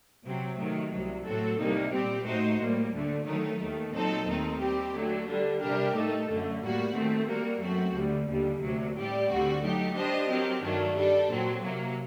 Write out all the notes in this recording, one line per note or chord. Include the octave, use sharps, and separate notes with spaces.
C3 F#3 C4
C3 D#3 F#3 A3
C2 C3 F#3
A2 F#3 C4 F#4 A4
C2 C3 G3 A#3 D#4
A#2 G3 C4 G4
A2 A3 D#4 F#4 C5
A2 G3 A#3
D2 D3 A3
D#3 F#3 A3 D#4
D#2 D#3 A3
A#2 F#3 C4 D#4 A4
D#2 D#3 A3 C4 D#4
G3 C4 G4
D3 F#3 A3
D3 G3 D4
C3 G3 D4 G4 A#4
A2 A3 D#4 A4
F#2 D3 A3
A2 G3 A#3 F#4
D#3 A3 C4
G3 A#3 F#4 A#4
F#2 F#3 A3 C4 F#4
D2 D3 G3
D#2 D3 G3
D2 C3 F#3 A#3
A2 G3 C4 G4 D5
D2 D3 G3 C4 F#4
F#3 A3 D#4 G4
G3 D4 G4 C5 D#5
F#3 C4 G4 A#4
G2 D#3 F#3 A3 D4
G3 D4 A4
A#2 F#3 C4
C3 F#3 A#3